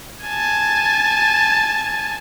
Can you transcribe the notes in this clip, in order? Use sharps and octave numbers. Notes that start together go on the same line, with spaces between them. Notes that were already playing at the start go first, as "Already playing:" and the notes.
G#5 A5